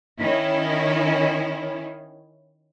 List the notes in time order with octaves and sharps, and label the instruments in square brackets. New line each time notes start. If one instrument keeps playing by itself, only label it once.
[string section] D#3 C#4 E4